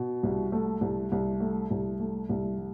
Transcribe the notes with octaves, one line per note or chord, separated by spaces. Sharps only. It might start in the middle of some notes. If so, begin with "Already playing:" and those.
Already playing: B2
C2
A3
C2
C2
A3
C2
A3
C2
G3